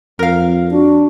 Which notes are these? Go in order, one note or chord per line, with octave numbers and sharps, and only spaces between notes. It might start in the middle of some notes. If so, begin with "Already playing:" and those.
F2 A#4 F5
D4 F#4